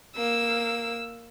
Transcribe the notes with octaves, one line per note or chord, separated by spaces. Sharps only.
A#3 E6